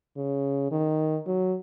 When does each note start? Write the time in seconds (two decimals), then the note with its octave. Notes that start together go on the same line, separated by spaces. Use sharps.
0.16 C#3
0.71 D#3
1.27 F#3